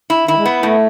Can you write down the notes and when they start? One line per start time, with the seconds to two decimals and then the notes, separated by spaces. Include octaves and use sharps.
0.10 E4
0.27 D#3 E4
0.37 G#3
0.45 B3
0.62 A2 A3